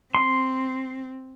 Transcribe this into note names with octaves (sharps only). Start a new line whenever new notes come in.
C4 C6